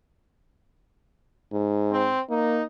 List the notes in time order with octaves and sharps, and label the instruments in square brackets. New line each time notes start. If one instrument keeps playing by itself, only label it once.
[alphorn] G#2
[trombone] C4
[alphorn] A#3 [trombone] D#4